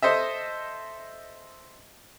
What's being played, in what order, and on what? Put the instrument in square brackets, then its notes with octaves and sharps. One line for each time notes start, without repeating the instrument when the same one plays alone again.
[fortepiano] A4 C5 D#5 E5